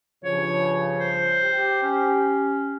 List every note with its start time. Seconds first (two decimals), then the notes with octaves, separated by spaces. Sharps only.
0.25 G2 C#3 F3 C#5
0.99 C5
1.44 G4
1.83 C#4